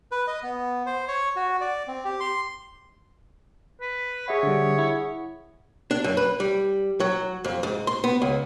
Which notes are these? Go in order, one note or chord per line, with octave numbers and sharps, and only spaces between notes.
B4
D#5
B3
C5
C#5
F#4
D5
C4
G4
C6
B4
G#4 C#5 E5 F#5
D3 G3
E4
D4
F#2
B4
G3
F#3
F2
G#2
C6
B3
C#2